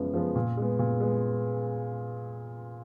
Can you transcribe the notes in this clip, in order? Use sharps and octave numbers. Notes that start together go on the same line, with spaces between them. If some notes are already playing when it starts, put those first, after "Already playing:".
Already playing: F#2 F3 G#3 B3
F3 G#3 B3
A#2
G#3 B3
A#2
G#3 B3